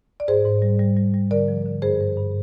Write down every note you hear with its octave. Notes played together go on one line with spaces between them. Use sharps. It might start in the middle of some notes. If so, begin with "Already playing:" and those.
D5
G#2 G#4 C5
G#2
G3
G3
G3
G3
D3 A#4 D5
F3
D3
G2 G#4 C5
G2
G2